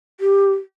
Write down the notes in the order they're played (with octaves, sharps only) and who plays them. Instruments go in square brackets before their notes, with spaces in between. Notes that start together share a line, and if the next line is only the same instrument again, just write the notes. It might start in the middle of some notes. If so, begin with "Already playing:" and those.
[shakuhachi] G4